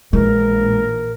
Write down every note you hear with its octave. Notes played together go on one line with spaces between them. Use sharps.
A#1 E3 G#3 A#4